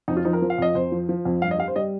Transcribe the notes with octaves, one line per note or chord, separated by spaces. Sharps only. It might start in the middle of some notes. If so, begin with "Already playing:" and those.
F2 D#4
F4
F3 D#4
A#4
F3
F5
F2 D#5
F2 C5
F3
F3
F2
G2 F5
D#5
G3 F5
C5
G3 D#5